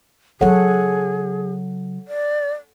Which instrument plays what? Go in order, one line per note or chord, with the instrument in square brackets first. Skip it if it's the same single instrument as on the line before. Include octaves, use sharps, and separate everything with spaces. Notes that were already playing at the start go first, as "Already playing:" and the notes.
[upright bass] C#3 F#3 [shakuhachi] G#4 [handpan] A4 C#5 F#5
[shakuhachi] D5